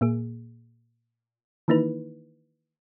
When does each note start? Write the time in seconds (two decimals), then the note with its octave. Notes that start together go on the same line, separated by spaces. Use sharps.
0.01 A#2 A#3 G#4
1.68 D#3 E3 A#3 D#4 E4 B4